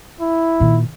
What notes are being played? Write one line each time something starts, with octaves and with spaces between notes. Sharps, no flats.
E4
A#2 D#3